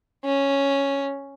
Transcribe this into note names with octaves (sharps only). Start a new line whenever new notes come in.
C#4